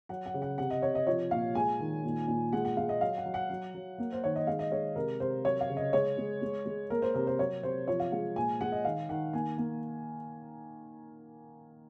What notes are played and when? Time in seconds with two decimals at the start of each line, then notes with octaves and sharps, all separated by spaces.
0.09 F#3 F#5
0.26 F#5
0.34 C#3
0.42 F#5
0.58 C3 F#5
0.71 D#5
0.82 C3 C#5
0.95 D#5
1.07 F3 C#5
1.31 A#2 F5
1.55 G#3 G#5
1.80 D#3
2.04 A#2
2.28 A#2
2.52 G#3 F#5
2.65 F#5
2.77 G#3 F5
2.89 D#5
3.01 F#3 F5
3.18 F#5
3.26 F#3
3.34 F#5
3.50 F#3
3.74 F#3
3.98 A#3
4.12 C5
4.23 D#3 C#5
4.36 D#5
4.47 G#3 F5
4.59 D#5
4.71 G#3 C#5
4.96 C3 A#4
5.20 C3 C5
5.44 F#3 C#5
5.61 F5
5.69 C#3
5.77 D#5
5.93 G#3 C#5
6.18 G#3
6.42 G#3
6.66 G#3
6.90 A#3 A#4
7.02 C5
7.14 C3 A#4
7.27 C5
7.39 F#3 C#5
7.63 C3 C5
7.88 F3 C#5
8.00 F5
8.12 G#3 F5
8.36 A#2 G#5
8.61 G#3 F#5
8.72 D#5
8.85 D#3 F5
9.09 D#3 F#5
9.33 A#3 G#5
9.58 A#3